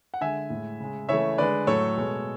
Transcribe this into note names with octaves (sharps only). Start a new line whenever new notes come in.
F#5
D3 G#3 E5 G#5
A2 G#3
C#3 G#3
C#3 E3 A3 C#5 E5
D3 G#3 B4 D5
A2 F#3 A3 A4 C#5
B2 G#3